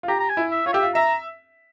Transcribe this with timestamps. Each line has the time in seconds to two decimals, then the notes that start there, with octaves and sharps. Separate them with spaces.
0.03 F4
0.08 G4 A#5
0.20 A#5
0.30 G#5
0.37 E4
0.51 E5
0.66 F4 C#5
0.73 G4 E5
0.82 F4
0.95 E5 A#5